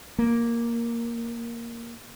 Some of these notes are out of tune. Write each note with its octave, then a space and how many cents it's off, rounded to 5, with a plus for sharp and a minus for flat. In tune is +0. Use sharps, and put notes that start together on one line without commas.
A#3 +0